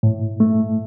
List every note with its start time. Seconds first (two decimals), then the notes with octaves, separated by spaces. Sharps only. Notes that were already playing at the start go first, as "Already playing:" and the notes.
0.03 A2
0.40 A3